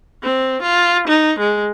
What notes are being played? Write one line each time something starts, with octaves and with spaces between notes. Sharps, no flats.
C4
F4
D#4
G#3